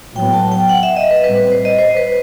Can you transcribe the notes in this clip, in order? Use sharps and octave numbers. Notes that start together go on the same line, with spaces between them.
A2 F#3 B3 G5
A5
G5
F#5
E5
D#5
B4
A2 G3 C4 B4
B4
C5
D#5
C5
B4